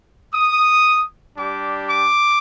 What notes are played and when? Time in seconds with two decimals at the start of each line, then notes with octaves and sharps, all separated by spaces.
0.33 D#6
1.36 G3 D4 G4 D6
1.88 D6